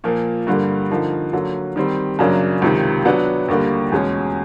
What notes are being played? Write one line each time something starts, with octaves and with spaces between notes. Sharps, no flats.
A#2 F3 A#3
G2 D3 G3 A#3
D3 F3 A#3 D#4
D3 F#3 A#3
D#3 G3 C4
F#2 C#3 F#3 A#3 D4
C#2 C3 D#3
F#3 B3 D4
D#2 D3 G3 A#3
E2 B2 G#3 C#4